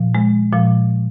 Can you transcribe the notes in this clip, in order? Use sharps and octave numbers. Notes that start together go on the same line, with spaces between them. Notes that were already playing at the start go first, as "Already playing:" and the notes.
Already playing: A#2 F3
G#3
A#2 F3